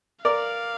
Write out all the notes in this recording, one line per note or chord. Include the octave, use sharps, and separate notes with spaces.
A#4 D5 F5